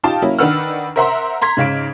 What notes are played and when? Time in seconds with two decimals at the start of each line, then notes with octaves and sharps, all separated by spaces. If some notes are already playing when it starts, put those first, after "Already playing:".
0.04 D#4 F4 G4 F5 G5 A5
0.22 F#3 A#3 C#4 E4
0.39 D#3 D4 B4 F#5 E6 F6
0.96 A#4 C5 E5 F#5 A#5 C6
1.42 A#5 C6 G#6 B6
1.57 G#2 C#3 F5 B6 D7